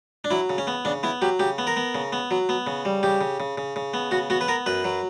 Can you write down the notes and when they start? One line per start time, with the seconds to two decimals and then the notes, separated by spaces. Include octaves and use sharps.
0.24 D4
0.31 F#3 E4
0.50 C#3
0.58 C#4
0.67 B3
0.85 C#3 D4
1.03 B3 E4
1.22 F#3 G4
1.40 C#3 G4
1.58 B3
1.67 A#4
1.77 B3
1.95 C#3
2.13 B3
2.31 F#3
2.49 B3
2.67 C#3
2.85 G3
3.03 C#3 G4
3.21 C#3
3.40 C#3
3.58 C#3
3.76 C#3
3.94 B3
4.11 C#3 F#4
4.30 B3 F#4
4.41 B4
4.48 B3 A#4
4.66 F#2 B4
4.84 F#3